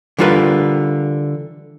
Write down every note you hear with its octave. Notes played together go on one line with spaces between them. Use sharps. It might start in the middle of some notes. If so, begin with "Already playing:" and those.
D3 E3 G3 F4 A#4 B4